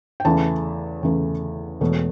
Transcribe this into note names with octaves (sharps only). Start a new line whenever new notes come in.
G5
E2 C#3 E3 A3 A5
E2 C#3 E3 A3
E1 E2 B2 A3